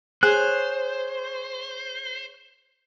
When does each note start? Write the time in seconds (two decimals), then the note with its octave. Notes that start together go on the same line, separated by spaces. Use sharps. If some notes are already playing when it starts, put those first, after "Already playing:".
0.23 G#4 C5 C#5 F#6